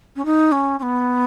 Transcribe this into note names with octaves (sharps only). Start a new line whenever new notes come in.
C#4
D#4
C#4
C#4
B3